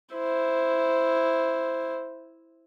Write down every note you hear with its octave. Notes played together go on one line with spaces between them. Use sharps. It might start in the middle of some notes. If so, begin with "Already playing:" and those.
E4 C5